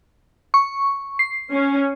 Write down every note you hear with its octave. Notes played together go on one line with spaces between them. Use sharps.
C#6
C7
C#4